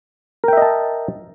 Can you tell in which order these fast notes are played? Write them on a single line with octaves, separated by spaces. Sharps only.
A#4 G5 E5 D#5 A5